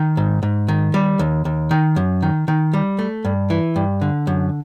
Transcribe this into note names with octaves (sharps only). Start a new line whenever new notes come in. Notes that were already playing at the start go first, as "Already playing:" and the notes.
Already playing: D#3
G#2
G#2
D#3
G3
D#2
D#2
D#3
F#2
D#3
D#3
G3
A3
G2
E3
G2
D3
F#2